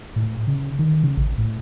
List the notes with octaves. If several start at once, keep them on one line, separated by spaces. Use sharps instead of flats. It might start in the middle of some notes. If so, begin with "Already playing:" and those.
A2
C#3
D#3
C#3
A1
A2